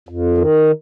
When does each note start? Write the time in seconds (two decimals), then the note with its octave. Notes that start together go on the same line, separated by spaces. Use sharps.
0.09 F2
0.38 D#3